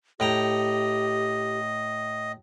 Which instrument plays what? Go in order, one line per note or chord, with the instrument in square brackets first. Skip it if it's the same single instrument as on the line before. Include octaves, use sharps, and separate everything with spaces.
[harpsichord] A2 G5 A#5 [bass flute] G4 [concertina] D#5